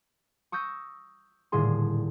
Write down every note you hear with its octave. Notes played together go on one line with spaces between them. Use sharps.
C#6 D#6 E6 G6 A#6 D#7
D#1 A2 D3 G#4 C6